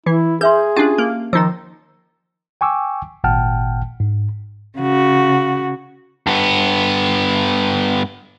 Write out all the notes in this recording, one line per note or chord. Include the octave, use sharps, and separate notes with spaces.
E3 E4
G#4 B4 E5 C6 G6
C#4 D4 F4 G4 A5
A#3
D#3 F3 D#4 A#5 E6
G5 G#5 C#6 D6 E6
G#1 A#2 F#5 G5 A5 F6
G#2
C#3 F#4
G2 B3